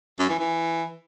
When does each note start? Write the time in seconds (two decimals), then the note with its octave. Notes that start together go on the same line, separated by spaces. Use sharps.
0.19 F#2
0.29 E3
0.39 E3